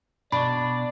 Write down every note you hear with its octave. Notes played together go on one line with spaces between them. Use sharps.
B2 D4 D5 B5 C#6